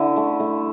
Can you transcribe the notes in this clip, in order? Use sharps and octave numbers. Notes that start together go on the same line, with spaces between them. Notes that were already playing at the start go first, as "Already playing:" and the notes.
Already playing: D3 E4
A3
A3